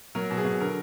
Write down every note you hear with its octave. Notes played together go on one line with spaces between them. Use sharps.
F#3 A#4
B2
G#4
F#3
D3 A#4